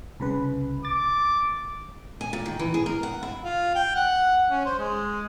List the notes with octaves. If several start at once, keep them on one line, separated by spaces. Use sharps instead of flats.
C2 C#3 B4
D6 A6
G#5
A#2
D#3
E3
G#4
A#4
F#5
E4
F4
G5
F#5
C#4
C5
G#3